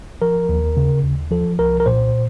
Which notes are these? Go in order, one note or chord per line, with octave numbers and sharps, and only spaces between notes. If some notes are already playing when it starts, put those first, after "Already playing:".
F3 A#4
D#2
C#3
D#2
F3 A4
C2 A#4
A#4
A#2 C5